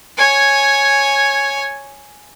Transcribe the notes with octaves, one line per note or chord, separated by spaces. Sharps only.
C#5 G#5